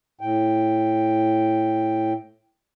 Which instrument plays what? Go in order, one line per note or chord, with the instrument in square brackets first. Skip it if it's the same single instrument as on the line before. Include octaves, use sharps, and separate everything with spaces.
[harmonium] A2 G5